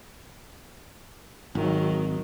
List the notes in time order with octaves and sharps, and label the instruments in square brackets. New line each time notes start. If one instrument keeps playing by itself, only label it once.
[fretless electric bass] G#1 [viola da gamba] D#3 F#3